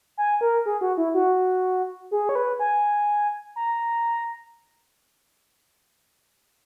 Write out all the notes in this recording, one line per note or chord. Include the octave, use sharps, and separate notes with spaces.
G#5
A#4
G#4
F#4
E4
F#4
G#4
C#5
B4
G#5
A#5